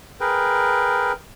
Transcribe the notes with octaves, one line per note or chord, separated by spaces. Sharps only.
G#4 A#4 B4 G5